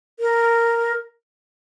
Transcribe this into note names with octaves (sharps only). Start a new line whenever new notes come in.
A#4